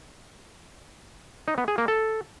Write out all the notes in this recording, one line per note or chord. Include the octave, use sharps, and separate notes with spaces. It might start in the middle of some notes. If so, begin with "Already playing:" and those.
D#4
B3
G#4
A#3
A4